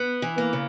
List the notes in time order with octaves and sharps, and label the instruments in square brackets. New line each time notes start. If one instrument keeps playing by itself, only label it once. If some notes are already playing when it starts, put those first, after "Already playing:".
Already playing: [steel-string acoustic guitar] B3
E3
A#3
C#3